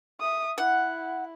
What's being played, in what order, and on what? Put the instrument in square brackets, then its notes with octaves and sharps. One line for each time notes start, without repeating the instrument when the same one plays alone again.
[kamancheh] E5 D#6
[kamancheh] E4 [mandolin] F#5